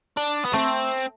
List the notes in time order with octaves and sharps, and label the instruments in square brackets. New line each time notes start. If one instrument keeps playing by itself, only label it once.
[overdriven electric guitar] D4
B3
[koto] A3 [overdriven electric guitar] C4